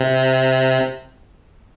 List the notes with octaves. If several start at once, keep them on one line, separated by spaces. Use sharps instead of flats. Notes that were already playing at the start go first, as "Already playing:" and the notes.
Already playing: C3